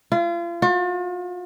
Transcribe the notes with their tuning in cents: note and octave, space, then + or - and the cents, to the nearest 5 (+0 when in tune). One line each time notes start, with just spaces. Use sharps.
F4 -35
F4 +45